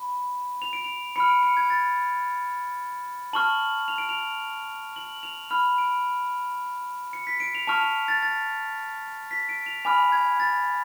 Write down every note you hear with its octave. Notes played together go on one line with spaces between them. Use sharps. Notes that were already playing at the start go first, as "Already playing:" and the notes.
Already playing: B5
F7
D7
F7
B5 F6 C#7
D7
C#7
G#6
A6
A5 C#6 F6 F#7
F7
D7
F7
F#7
F7
B5 F6 F7
D7
C#7
B6
D7
F7
A5 C#6 F6 F7
F7
A6
A6
B6
D7
F7
G#5 B5 D6 F6 F7
G#6
A6